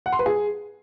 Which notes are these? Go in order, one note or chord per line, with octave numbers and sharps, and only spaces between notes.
F#5
C6
B4
G#4